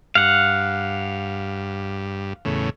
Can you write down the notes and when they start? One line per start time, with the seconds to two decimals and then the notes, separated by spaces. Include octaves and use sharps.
0.15 G2 F5 F#5
2.45 E2 A2 C#3